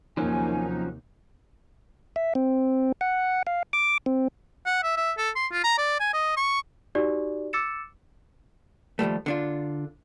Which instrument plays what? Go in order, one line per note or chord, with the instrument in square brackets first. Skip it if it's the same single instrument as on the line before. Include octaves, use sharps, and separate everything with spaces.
[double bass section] D#2 C3 A#3 [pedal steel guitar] F3 F#3 C#4 [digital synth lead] D#4 [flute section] G#5
[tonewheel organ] E5
C4
F#5
F5
D6
C4
[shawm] F#5
E5
E5
A4
C6
F4
A#5
D5
G#5
D#5
C#6
[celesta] D#4 F#4 G4 D5
D6 E6 A6 C#7 E7
[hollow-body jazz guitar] D#2 F3 G3 A3
D3 D4 F4